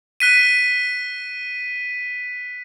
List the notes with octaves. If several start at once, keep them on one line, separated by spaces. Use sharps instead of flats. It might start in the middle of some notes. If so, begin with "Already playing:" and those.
F#6 B6 D#7